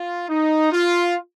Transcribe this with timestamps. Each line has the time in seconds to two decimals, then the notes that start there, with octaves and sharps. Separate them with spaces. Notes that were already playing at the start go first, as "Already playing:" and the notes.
Already playing: F4
0.29 D#4
0.72 F4